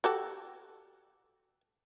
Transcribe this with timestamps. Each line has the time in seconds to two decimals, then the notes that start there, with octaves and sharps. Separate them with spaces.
0.04 F#4 G4 A4